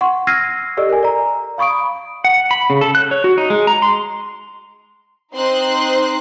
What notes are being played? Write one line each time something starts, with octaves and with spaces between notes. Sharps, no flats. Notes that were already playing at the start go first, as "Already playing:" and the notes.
F#5 C6 C#6
E6 F6 G#6 A#6 C7 D#7
G4 A4 D5 D#5 E6
A#4 G#5
D5 A#5
F5 B5 C#6 D#6 D7
F#5
B5
C#3
A4
F#6
C#5
F#4
D#4
G#3
A#5
C6
C4 D#4 C5 C6 F#6